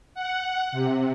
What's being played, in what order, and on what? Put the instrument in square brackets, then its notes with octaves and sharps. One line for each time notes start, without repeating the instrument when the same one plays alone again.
[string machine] F#5
C3